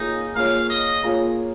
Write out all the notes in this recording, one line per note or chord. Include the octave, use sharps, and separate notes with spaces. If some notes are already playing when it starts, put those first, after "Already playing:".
Already playing: A#3 D#4 F4 G#4 C#5
A#3 F4 G#4 C#5 F5
D#5
A#3 F4 G#4 C#5